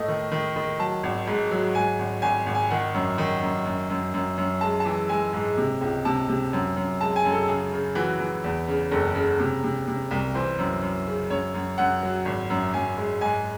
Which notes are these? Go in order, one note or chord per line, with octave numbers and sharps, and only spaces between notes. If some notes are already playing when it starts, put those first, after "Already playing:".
Already playing: A2 A3 D#5
D#3
D#3
D#3
F#3 A5
G#1
G#2
F#3
G#2 G#5
G#1
G#1 G#5
G#1
G#5
D#3 F#5
F#2
D#3
F#2
F#2
F#2
F#2
F#2
G#3 A5
A5
E3
G#3 G#5
G#2
C3
C#2
C3 A5
C3
F#2
F#2
G#3 A5
G#5
F#2
A4
C#3 G#4
C#3
E3 F#4
E3
E2
C#3
F#1 A4
C#3
C3
C3
C3
C2
E3 C5
F#2
F#2
C#3
F#2 C#5
F#2
F#2 F#5
F#3
G#1
F#2
F#2 G#5
G#3
G#2 G#5